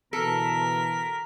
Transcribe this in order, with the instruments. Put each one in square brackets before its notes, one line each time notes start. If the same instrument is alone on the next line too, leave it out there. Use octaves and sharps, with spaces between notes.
[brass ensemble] B2 D3 E3 [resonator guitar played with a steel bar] A4 [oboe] A#4 [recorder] B6